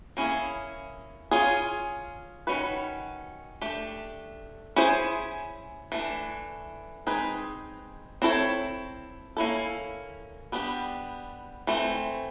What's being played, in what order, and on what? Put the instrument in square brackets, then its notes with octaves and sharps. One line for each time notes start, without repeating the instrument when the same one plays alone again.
[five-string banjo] A#3 C#4 E4 G#4
C#4 F4 G#4
D#3 G#3 C#4 F#4 B4
A3 D4 G4
C#4 E4 G#4 C5
E3 A3 D4
G#3 C4 D#4 G#4 B4
C4 E4 A4 C#5
A#3 C#4 E4 A4
G3 B3 D4 G4
E3 A3 C4